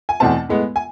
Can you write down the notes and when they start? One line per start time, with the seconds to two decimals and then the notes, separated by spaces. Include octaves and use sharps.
0.09 G#5
0.20 E2 B2 A3 C4 A5
0.49 A2 G#3 B3
0.76 G#5